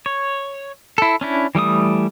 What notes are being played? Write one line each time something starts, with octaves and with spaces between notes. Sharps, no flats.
C#5
E4 A4
C#4 D4 E4
E3 G3 A3 D#6